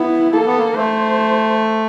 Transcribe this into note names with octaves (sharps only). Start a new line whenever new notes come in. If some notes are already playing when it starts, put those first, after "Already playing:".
Already playing: B3 E4
A#3 A4
B3
A#3
A3 C5